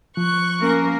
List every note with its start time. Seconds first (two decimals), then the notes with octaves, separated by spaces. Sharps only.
0.17 F3 C#6 F#6
0.61 A#3 C#4 A#4